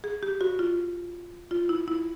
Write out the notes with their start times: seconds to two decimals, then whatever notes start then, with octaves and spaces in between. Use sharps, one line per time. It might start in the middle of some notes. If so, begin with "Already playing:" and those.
0.04 G#4
0.23 G4
0.41 F#4
0.59 F4
1.51 F4
1.69 E4
1.88 E4